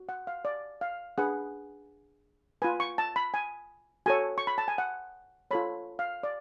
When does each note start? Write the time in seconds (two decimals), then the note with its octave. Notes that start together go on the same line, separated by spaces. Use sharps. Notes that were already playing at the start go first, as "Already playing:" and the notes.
Already playing: F#4
0.09 F#5
0.27 F5
0.45 D5
0.81 F5
1.18 D4 G#4 B4 F#5
2.62 F4 B4 G#5
2.80 C#6
2.98 A5
3.16 B5
3.34 G#5
4.06 F#4 A4 C#5 G#5
4.38 C#6
4.47 B5
4.58 A5
4.68 G#5
4.78 F#5
5.51 F4 A4 C#5 B5
5.99 F5
6.23 D5